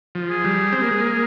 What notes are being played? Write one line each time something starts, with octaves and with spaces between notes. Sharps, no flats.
F3
G#4
G3
C4
A#3
G#3
A#3